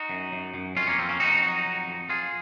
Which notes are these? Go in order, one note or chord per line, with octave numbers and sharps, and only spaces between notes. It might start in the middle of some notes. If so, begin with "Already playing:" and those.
Already playing: D#4 F#4
F#2
F#2
F#2
F2 C#4 F4
A#3 C#4
F2 C4
A#3 C#4
F2 D#4 F#4
F#3
F2
F2
F2 F4 G#4